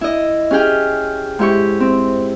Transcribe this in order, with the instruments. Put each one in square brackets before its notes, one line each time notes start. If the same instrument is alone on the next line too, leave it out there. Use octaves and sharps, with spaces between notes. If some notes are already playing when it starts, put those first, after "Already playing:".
[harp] E4 D#5
C#4 G4 G#4 G5 F6
G#2 E4 G4 C#6
C4